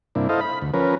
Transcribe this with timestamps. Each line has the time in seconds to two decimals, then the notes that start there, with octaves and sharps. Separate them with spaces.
0.15 G2 C3 A#3 D4 E4
0.29 E4 A4 C5 D#5 F5
0.41 B5
0.62 D2
0.74 F3 C#4 A#4 B4